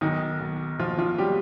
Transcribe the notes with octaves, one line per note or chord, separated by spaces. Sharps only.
B1 D#3 D#4
B1
B2 F3 F4
F3 F4
F#3 G3 G4